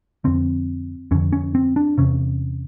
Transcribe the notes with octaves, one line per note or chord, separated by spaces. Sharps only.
F2 D3 C4
F2 D3 C#4
C#4
C4
D4
E2 C3 C#4